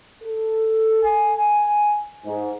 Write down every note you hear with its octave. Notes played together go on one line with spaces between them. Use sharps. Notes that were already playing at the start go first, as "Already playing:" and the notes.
A4
G#5
G#2